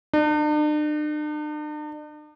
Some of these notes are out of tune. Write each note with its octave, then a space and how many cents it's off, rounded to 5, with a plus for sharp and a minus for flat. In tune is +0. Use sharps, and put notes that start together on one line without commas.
D4 +45